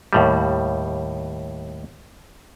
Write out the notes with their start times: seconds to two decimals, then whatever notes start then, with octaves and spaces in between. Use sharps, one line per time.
0.13 D#2 A2 G3